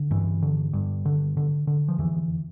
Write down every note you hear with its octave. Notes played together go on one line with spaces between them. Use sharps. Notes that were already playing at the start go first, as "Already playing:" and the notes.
Already playing: D3
G2 E3
D3
G2
D3
D3
D3
F3
F2 E3